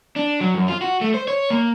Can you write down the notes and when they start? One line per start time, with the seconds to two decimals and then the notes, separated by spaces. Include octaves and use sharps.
0.16 D4
0.41 F#3
0.54 F#2
0.68 F4
0.81 F#4
1.01 A3
1.14 C5
1.28 C#5
1.50 A#3